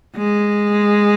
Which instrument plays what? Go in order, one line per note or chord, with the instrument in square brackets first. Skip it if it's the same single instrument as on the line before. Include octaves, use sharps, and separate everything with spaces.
[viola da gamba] G#3